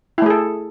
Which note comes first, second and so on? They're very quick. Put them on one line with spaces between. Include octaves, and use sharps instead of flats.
E4 A3 G#4 A4